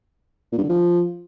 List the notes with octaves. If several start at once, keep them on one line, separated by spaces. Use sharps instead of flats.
A#2
G2
D3
F3